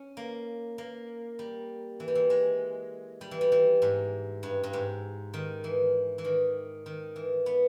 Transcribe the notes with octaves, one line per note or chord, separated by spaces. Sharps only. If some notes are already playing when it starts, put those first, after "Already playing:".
Already playing: C#4
A#3
A#3
G3
E3
G3
E3
G#3
G3
E3
G3
E3
G#2
G2
G2
G#2
D#3
E3
E3
D#3
D#3
E3
B3